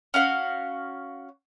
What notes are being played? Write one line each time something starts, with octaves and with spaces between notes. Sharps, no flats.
C#4 F#4 F5